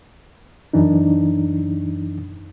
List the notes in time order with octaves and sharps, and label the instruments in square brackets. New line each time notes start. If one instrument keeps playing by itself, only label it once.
[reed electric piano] F#2 E3 D4 D#4